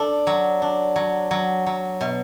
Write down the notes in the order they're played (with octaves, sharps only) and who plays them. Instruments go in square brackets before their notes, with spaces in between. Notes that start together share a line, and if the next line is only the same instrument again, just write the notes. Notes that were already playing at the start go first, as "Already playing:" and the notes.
Already playing: [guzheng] D4 A4
F#3
D4
F#3
F#3
F#3
B2